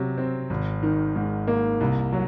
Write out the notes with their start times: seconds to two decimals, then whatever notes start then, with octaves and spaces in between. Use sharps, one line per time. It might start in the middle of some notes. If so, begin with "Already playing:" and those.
Already playing: C3 F#3
0.18 C4
0.50 G#1
0.83 D#3
1.15 G#2
1.47 A#3
1.80 C2
2.13 F#3